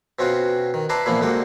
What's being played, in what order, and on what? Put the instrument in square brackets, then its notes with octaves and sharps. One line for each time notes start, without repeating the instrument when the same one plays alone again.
[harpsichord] B2 C4 C#4 F4 F#4
D#3
E4 B4 D5 A5 A#5 C6
A#2 E3 F3 A#3 B3 E4
C2 D3 G#3 A#3 F#4 G5